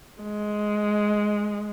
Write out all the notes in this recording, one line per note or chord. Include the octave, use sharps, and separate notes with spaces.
G#3